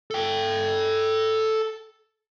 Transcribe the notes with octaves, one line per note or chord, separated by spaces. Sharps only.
A4 G5